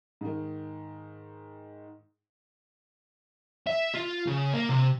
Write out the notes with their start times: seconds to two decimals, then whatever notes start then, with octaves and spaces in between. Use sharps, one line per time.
0.21 G#2 D#3
3.67 E5
3.95 F4
4.27 C#3
4.54 A#3
4.69 C3